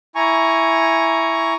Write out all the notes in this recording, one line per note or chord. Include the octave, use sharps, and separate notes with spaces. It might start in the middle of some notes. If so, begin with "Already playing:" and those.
E4 G#5 A#5 C#6